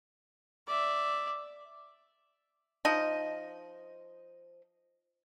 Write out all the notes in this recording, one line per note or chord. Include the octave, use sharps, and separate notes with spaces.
D5 E5
F3 D#4 D#5